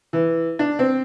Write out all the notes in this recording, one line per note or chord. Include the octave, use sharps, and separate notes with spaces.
E3
D4
C4